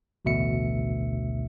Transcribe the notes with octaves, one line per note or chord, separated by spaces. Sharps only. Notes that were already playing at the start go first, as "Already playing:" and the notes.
A1 D2 B2 E5 C#7